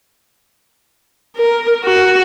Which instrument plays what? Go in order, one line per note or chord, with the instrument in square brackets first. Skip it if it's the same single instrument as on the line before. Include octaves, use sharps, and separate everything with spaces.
[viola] A#4
F#4